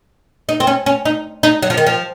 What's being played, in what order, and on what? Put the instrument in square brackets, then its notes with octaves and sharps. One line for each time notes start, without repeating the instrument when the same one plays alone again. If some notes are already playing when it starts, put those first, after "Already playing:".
[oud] D#4
C4
C#4
C#4
D#4
D#4
F#3
F3
D#3
F3